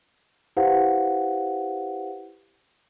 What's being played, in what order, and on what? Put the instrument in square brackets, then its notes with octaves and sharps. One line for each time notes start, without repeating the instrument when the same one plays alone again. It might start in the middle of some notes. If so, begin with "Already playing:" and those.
[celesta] E4 G4 B4 C5 F5 F#5